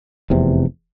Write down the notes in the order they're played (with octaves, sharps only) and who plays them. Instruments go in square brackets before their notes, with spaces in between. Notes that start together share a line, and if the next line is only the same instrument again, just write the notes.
[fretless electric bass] F1 E2 C3